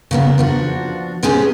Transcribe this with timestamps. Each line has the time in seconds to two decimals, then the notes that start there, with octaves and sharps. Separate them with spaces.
0.11 C#3 A#3 B3
0.38 F3 D4 F#4
1.23 C3 G#3 B3 C#4 G4 G#4